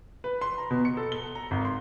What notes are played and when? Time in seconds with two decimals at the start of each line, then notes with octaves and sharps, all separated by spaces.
0.24 B4
0.41 C6
0.58 A#5
0.71 B2
0.85 C#7
0.97 A4
1.12 G7
1.35 A#5
1.51 G#1
1.65 C6